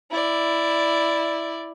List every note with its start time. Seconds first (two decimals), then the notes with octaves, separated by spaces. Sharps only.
0.11 E4 D5